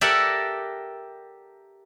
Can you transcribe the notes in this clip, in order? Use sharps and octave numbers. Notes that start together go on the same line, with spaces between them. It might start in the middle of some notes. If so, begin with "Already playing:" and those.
G4 A4 A#4 D5 E5 F#5